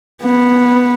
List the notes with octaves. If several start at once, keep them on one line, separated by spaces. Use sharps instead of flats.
B3